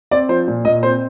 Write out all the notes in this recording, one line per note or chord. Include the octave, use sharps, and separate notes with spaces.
C4 D5
F3 C5
A#2
A#2 D#5
C4 C5